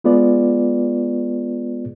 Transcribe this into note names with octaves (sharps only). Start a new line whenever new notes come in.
G#3 B3 F4 G#4 B4 D5